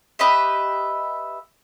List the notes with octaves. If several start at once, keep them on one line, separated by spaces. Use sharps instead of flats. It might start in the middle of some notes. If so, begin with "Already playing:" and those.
G4 B4 D#5 E5